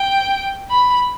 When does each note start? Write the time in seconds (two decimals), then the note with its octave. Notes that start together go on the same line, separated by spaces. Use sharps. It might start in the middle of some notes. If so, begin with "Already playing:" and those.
Already playing: G5
0.70 B5